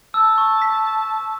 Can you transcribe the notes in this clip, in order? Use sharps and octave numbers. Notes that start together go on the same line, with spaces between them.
A5 E6
C#6
B6